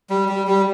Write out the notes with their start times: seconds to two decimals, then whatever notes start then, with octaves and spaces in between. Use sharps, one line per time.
0.10 G3
0.28 G3
0.47 G3